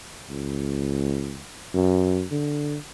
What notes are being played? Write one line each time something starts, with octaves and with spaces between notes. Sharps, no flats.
C#2
F#2
D3